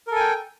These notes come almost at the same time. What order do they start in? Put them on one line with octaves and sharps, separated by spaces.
A#4 A4 G#5 G5